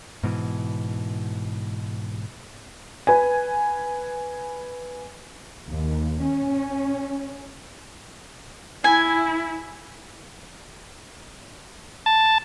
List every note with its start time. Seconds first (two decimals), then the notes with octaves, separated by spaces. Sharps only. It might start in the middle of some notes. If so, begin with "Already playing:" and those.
0.23 G#2 B2 E3
3.07 B4 G#5
5.69 D#2
6.24 C#4
8.84 E4 G#5
12.06 A5